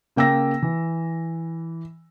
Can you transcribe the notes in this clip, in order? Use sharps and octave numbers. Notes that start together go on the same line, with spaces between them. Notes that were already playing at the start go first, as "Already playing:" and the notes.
C#3 A#3 G5 E6 A#6
E3